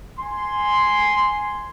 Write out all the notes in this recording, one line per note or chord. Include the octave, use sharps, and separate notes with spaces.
G#5 C6